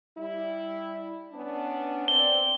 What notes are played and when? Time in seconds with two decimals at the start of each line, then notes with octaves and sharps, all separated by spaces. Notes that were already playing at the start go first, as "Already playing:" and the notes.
0.18 G3 E4
1.32 B3 C#4 D4
2.08 C4 D5 G7